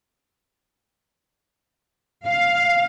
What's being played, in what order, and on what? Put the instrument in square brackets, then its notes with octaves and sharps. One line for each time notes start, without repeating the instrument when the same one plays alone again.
[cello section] F5